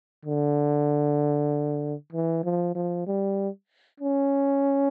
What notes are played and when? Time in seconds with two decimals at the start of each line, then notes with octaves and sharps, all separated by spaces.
0.25 D3
2.12 E3
2.44 F3
2.75 F3
3.07 G3
4.00 C#4